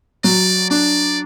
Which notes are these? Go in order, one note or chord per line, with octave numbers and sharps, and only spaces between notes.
F#3 D5
D4 D5